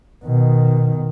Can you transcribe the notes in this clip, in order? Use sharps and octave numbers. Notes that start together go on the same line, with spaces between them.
B2 D#3